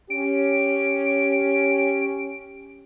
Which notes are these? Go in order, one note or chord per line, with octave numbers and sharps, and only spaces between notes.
C#4 G4 D7